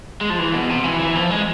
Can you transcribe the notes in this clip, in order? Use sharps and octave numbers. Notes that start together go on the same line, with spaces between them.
G#3
F3
E3
B2
C3
E3
E3
F3
G#3